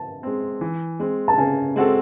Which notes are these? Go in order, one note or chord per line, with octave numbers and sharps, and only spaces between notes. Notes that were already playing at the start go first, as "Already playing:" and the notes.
Already playing: A5
G#3 C4
E3
G#3 C4
A5
C#3 G#5
G#3 C4 F#4 A4